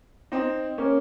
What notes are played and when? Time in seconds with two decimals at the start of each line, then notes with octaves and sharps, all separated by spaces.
0.32 C4 D#4
0.78 A#3 C#4